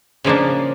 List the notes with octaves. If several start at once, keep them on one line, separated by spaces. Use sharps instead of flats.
C#3 F3 A#3 D4